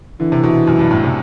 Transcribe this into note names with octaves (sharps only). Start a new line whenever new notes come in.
D3 E3
C3
B2
F#2
G2
A2
C3